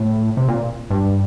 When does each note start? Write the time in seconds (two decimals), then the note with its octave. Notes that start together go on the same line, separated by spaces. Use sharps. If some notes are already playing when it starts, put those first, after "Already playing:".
Already playing: A2
0.37 C3
0.48 A#2
0.90 G2